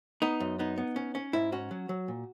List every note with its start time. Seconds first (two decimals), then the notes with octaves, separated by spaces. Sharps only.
0.22 B3 D#4
0.40 F#2
0.59 B3 D#4
0.78 B3
0.96 C#4
1.15 C#4
1.33 G#2 E4
1.52 C#4 F#4
1.71 F#3
1.89 F#3
2.08 A#2